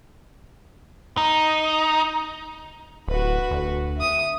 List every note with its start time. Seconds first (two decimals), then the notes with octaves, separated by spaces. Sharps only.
1.17 D#4
3.08 D1 F#4 B4
3.51 D2
3.96 E5 D#6